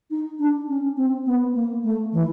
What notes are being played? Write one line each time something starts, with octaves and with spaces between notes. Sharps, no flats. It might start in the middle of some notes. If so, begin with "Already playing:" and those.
D#4
D4
C#4
C4
B3
A#3
A3
E3